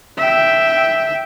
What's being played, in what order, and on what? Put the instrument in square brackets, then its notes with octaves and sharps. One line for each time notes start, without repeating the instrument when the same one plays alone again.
[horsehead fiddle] E5 G5